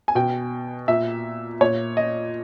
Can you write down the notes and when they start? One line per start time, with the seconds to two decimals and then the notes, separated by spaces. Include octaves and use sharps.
0.08 G#5
0.15 B2 G5
0.88 A#2 E5
1.61 A#2 C#5
1.97 D#5